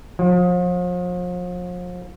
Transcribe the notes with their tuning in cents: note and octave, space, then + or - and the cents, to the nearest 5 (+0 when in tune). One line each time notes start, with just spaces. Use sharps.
F3 +40